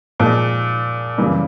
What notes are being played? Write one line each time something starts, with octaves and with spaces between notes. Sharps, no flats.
A#2 F3 G#3
F#2 C#3 E3 G3 A#3